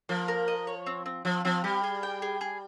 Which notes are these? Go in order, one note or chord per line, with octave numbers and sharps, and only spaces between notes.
F3 A#3
A#4
D#5
C#5
C4
C4
F3 C4
F3 C4
G3 G4
G#4
G5
G#4
G#4